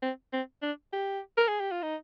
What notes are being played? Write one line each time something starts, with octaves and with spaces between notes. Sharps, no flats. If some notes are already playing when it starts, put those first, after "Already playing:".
C4
C4
D4
G4
A#4
G#4
G4
F4
D#4